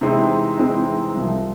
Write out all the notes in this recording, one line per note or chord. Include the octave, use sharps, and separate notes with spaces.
C3 E3 G#3 C4 D#4
C3 E3 G#3 C4 D#4
C2 C3 F3